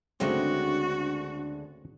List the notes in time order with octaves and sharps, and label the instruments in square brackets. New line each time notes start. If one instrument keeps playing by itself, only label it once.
[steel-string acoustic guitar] D2 G#3 D4 [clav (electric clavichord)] C#3 A3 C4 [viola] F#4